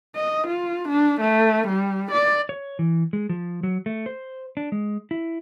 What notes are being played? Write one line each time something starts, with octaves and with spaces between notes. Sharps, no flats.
D#5
F4
D4
A3
G3
D5
C#5
E3
G#3
F3
F#3
A3
C5
D4
G#3
E4